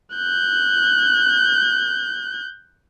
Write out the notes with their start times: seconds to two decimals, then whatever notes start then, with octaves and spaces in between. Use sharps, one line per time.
0.15 F#6 G6